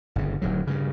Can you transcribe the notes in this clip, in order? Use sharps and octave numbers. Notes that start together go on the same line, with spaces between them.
G1 C#3
D1 D#2 F#3
G2 C#3